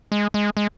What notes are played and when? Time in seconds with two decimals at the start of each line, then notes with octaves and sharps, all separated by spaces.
0.12 G#3
0.34 G#3
0.57 G#3